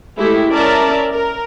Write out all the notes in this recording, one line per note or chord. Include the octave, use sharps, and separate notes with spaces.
G#3 A3 E4 G4 A4
C#4 A#4 D5 E5 A5
A#4